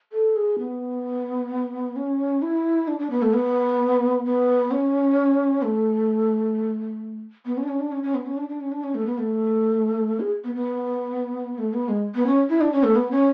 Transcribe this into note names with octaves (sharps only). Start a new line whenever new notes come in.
A4
G#4
B3
C#4
E4
D4
D4
B3
A3
B3
B3
C#4
A3
B3
C#4
D4
C#4
D4
C#4
C#4
B3
C#4
D4
D4
C#4
D4
C#4
A3
B3
A3
G#4
B3
B3
A3
B3
G#3
B3
C#4
E4
D4
C#4
A3
B3
C#4